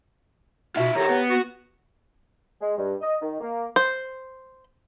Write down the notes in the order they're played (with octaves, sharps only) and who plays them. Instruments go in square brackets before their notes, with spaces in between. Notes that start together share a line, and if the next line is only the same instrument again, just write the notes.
[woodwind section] B2 [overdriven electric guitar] F4 E5
[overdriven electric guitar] D#3 A4 [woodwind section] G4 C#5 A#5
[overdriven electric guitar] B3
[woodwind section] F#4
G#3
G2
D#5
D#3
A#3
[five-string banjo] C5